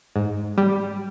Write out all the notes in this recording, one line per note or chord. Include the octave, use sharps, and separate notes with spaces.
G#2
G3